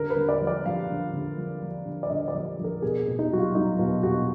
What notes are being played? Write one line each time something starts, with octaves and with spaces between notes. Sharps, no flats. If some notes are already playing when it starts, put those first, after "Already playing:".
Already playing: D3 A#4
B4
D3
D5
F3
D5
F3 F5
D3
D3
F3
F3
D3
D5
D3 D#5
D5
F3
F3
A#4
B2 G#4
B2
D#4
F#3 F#4
F4
F#3 D#4
B2 F4
B2 F#4